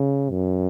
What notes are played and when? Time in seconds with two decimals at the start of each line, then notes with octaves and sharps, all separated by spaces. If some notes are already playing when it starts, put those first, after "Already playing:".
Already playing: C#3
0.31 F#2